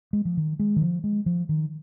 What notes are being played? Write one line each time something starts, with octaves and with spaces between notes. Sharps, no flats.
G#3
F3
D#3
G#3
D#3
F3
G#3
F3
D#3